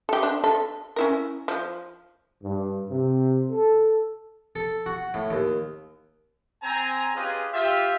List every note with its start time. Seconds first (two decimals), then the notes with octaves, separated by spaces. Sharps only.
0.09 G4 A4
0.23 D4
0.44 A4
0.96 C#4 E4 A#4
1.48 F3
2.43 G2
2.90 C3
3.51 A4
4.56 A4
4.86 F#4
5.14 A2
5.31 D#2
6.63 C4 G#5 A#5
7.14 C#4 F4 G4 G#4 B4 D#5
7.53 F4 G4 E5